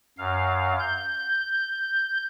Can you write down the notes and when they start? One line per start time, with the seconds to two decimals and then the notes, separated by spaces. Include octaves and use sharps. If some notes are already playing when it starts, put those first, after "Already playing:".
0.18 F#2 F5
0.80 G6